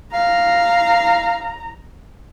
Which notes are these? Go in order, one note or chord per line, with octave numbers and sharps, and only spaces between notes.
F5 A#5